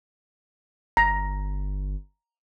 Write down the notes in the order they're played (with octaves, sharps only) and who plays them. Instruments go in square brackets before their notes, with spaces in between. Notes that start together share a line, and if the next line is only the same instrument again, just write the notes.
[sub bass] G1 [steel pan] A#5